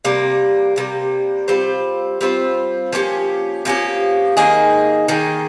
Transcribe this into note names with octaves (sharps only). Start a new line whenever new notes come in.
C3 G3 A#3
C3 G3 A#3
G3 C4 F4 C5
G3 C4 F4 C5
F3 A#3 C#4 G4
F3 A#3 C#4 G4
D#3 A#3 D#4 G#4
D#3 A#3 D#4 G#4